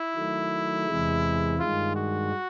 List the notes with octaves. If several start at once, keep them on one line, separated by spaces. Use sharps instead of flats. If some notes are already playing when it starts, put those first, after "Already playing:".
Already playing: E4
D#3 F#3 A3
E2 C3 E3 G#3
G2 D#3 G#3 F4
F#4